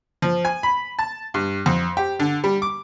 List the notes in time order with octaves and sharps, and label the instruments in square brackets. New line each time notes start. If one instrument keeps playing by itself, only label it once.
[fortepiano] F3
G#5
B5
A5
G2
F2
G4
D3
G3
D6